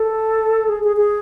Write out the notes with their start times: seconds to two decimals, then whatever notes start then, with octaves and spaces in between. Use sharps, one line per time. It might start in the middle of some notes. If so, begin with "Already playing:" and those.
Already playing: A4
0.69 G#4
0.83 G#4
0.97 G#4